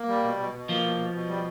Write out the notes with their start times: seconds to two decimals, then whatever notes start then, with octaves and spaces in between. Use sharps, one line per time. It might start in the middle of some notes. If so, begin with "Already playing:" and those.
Already playing: A#3
0.09 G3
0.24 B2
0.39 B2
0.55 B2
0.69 F3 A#3
0.84 B2
0.99 B2
1.14 B2
1.29 G3